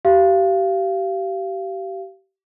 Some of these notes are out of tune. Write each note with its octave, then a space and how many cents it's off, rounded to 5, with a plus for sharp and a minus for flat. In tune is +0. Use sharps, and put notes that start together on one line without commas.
G4 -30 F5 -25